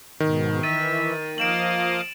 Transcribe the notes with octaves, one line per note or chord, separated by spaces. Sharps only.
G#2 B2 D#3
E3 E5 A6 D#7
F3 A#3 D#5 F5 D7 E7 F#7